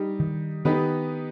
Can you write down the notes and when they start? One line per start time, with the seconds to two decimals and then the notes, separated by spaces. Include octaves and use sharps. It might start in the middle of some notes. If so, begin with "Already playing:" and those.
Already playing: G3 D#4 G4
0.20 D#3
0.65 D#3 B3 D#4 G4 B4